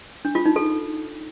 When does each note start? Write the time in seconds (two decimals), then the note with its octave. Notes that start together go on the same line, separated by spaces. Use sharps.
0.25 D4
0.35 F4
0.46 D#4
0.56 A4